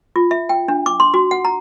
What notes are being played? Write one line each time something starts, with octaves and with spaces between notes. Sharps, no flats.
F4
E5
G5
D4
D6
C6
F#4
F#5
A#5